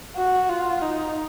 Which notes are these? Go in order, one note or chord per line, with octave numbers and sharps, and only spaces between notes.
F#4
F4
D#4